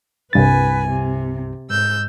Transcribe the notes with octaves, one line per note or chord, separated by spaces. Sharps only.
C2 G2 B4 G#5 A6
C3
G#2 E6 G6